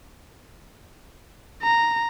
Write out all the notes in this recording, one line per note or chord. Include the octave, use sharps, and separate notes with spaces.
A#5